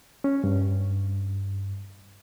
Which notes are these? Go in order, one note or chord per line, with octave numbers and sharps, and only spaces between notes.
C#4
G2